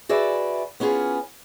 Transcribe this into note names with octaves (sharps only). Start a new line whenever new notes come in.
F#4 G#4 B4 D5 E5
B3 C#4 F4 G#4